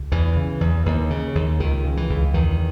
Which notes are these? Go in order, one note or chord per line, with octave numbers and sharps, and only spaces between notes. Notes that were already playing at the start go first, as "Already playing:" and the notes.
Already playing: C#2
E2 E3
C#3
E2
D#2
C#3
D#2
C#2 D#3
C#3
E3
C#2
E2 D#3